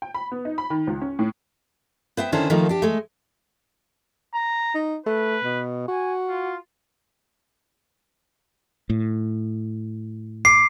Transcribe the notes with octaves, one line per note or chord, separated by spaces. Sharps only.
G5
B5
B3
D#4
B5
D#3
C#2
C#4
A2
B3 C5 E5 G5
D3 D#3 C#4 D4 E4 C5
D#3 F3 A3 A#3 D#4
D4 G4
G#3 A3
A#5
D#4
A3 B4
B2
F#4 G#5
F4
A2
D6 C7